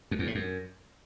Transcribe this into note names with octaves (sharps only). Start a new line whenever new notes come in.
F2
E2
A2
F#2